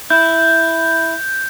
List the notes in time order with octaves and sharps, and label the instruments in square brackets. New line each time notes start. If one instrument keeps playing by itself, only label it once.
[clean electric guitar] E4 [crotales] G6